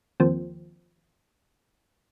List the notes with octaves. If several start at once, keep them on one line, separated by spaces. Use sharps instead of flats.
D#2 F3 C4